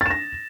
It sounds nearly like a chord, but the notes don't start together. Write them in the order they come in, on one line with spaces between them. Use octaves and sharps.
A6 E7 A#6